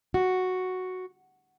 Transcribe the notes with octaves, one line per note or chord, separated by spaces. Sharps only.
F#4